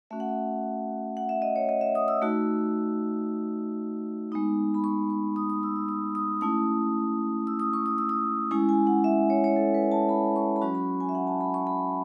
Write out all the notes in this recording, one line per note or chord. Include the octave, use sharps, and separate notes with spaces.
A3 C#4 F#4 E5
F#5
E5
F#5
E5
D#5
C#5
D#5
E5
D#6
E6
A3 D#4 F#4
G#3 B3 D#4
B5
C#6
C#6
D#6
D#6
E6
E6
D#6
D#6
A3 C#4 E4 D#6
E6
D#6
C#6
D#6
E6
D#6
G#3 C#4 E4 G#5
G#5
F#5
E5
C#5
C#5
A4
B4
A5
B5
C#6
B5
F#3 C#4 F#4 C#6
B5
G#5
E5
F#5
A5
B5
C#6
B5